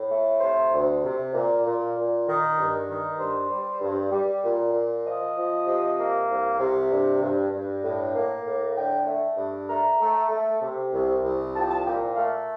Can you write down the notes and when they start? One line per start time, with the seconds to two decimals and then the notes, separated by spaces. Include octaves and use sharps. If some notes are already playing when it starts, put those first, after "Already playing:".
Already playing: A2
0.10 A3
0.41 C3 C5
0.72 D2
1.03 C3
1.34 A#2
1.64 A#2
1.96 A#2
2.27 D#3
2.58 G2
2.88 D#3
3.18 G2 C5
3.50 G3
3.81 G2
4.11 G3
4.43 A#2
4.73 A#2
5.04 F3 D#5
5.35 F3
5.66 C3
5.97 A#3
6.29 C2
6.58 C3
6.90 G2
7.21 G2
7.51 G2
7.82 A2
8.14 A#3
8.44 A2
8.75 D3 G5
9.06 A3
9.37 G2
9.68 A3 A#5
9.99 A3
10.30 A3
10.61 C3
10.92 C2
11.23 C2
11.54 F3 A5
11.61 G5
11.68 A5
11.85 A#2 G5
12.15 A3 F5